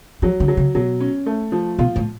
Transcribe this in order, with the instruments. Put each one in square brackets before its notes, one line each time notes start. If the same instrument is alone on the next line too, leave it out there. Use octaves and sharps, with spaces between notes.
[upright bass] F3 [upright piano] F#3
[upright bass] D3
[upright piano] F#3
[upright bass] C#3
[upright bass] B2 [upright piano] F#3
[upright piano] C#4
A3
F3
[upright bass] B2 [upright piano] F4
[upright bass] A2